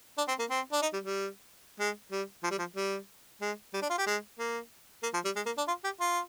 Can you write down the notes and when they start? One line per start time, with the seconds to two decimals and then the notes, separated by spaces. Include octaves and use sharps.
0.18 D4
0.28 C4
0.39 A#3
0.50 C4
0.73 D4
0.82 D#4
0.93 G3
1.04 G3
1.80 G#3
2.12 G3
2.44 F3
2.51 G3
2.59 F3
2.76 G3
3.41 G#3
3.74 G3
3.82 D4
3.90 F4
3.98 G4
4.06 G#3
4.39 A#3
5.03 A#3
5.14 F3
5.25 G3
5.36 G#3
5.46 A#3
5.58 D4
5.68 F4
5.84 G4
6.00 F4